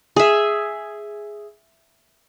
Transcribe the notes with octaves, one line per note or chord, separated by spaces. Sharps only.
G#4 E5